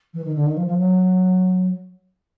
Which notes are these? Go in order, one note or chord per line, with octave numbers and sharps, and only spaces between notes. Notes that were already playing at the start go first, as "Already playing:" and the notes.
E3
D#3
D3
D#3
F3
F3
F#3